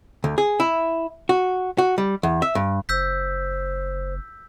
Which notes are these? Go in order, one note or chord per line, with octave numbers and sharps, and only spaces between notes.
D2
G#4
E4
F#4
F#4
G3
E2
E5
G2
F#1 C5 E6 G6 B6